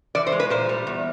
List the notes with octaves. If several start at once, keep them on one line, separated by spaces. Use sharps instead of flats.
E3 D5
C5
G#3
B4
A#2 C5
G3
E2